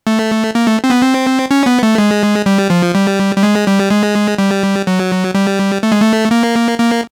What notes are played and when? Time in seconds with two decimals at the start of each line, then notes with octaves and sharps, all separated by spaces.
0.07 A3
0.55 A#3
0.66 A3
0.84 C4
0.90 B3
1.02 C4
1.51 C#4
1.66 B3
1.83 A3
1.98 G#3
2.46 G3
2.70 F3
2.95 G3
3.36 G3
3.43 G#3
3.67 G3
3.91 G#3
4.38 G3
4.87 F#3
5.35 G3
5.83 A3
5.92 G#3
6.00 A3
6.31 A#3
6.79 A#3